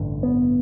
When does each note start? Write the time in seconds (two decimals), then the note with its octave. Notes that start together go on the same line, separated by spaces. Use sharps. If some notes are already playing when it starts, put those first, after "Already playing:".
Already playing: A1 G2 D3
0.23 B3